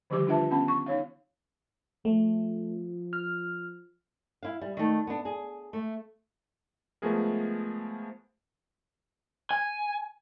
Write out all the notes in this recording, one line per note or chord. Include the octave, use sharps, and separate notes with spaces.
D3 D#3 F3 G3 G4 D6
D4 F4 B4 E5 A5
B3 C#4 F#5 A5 B5
C#6
D#4 C#5 F5
F3 A3
F6
E4 F5
G3
D#3 A3
B3 D4
G#4
A3
F3 G#3 A3 B3 G#4 A#4
G#5